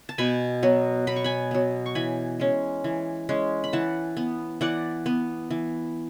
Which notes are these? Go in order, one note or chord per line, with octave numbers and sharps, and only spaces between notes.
A5
B2 G#5 B5
F#3 B3
B2 B5
C#6
G#5 B5
F#3 B3
C#6
E3 G#5 B5
G#3 C#4
E3
G#3 C#4
B5
E3 F#5 A5
B3
E3 D5 F#5
B3
E3